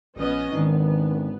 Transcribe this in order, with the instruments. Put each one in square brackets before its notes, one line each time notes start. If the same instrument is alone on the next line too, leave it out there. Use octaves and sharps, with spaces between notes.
[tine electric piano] A#1 F3 [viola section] B3 C#4 D#5
[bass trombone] G#1 [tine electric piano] D#3 D4 D#4 [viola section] B3